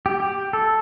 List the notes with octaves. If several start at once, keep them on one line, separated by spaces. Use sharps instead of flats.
G4
G4
A4